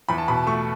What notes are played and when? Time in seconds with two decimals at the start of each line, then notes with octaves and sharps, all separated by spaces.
0.09 E2 B5
0.18 A5
0.28 B2 B5
0.47 A3 C#6